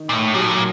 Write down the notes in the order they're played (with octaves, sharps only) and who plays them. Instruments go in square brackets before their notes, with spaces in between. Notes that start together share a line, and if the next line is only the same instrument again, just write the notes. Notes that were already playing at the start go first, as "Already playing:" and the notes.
Already playing: [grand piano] D#3
[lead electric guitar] A#2
A2
[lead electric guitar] A#2 [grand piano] F#3
[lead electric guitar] A2
A#2